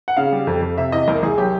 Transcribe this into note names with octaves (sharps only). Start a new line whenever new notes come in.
F#5
C#3 F5
G3
F2
F2
C3 E5
E2 D#5
C2 A#4
C2 G#4
F#3 G4